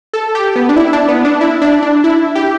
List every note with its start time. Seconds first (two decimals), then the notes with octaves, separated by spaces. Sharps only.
0.13 A4
0.35 G4
0.56 B3
0.69 D4
0.76 E4
0.93 D4
1.08 B3
1.25 D4
1.41 E4
1.62 D4
1.83 D4
2.04 E4
2.35 G4